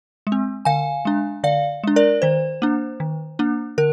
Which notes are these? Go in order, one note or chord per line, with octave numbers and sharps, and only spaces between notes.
G#3
C4
D3 F5 G#5
G#3 D4
D3 D5 F5
G#3 D4
A#4 D5
D#3 C5
A#3 D4
D#3
A#3 D4
D3 A#4